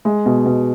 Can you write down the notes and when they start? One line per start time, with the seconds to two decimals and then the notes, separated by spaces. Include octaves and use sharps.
0.05 G#3
0.26 B2
0.46 B2